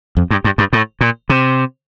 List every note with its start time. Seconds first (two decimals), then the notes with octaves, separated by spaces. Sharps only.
0.17 F2
0.31 G2
0.44 G2
0.58 G2
0.73 A2
1.01 A#2
1.29 C3